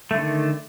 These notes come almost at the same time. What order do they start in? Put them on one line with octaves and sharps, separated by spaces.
A3 D3 D#3